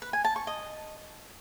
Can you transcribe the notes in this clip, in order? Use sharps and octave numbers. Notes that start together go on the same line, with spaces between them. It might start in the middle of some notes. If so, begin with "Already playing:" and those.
B4
G#5
A5
C#6
D#5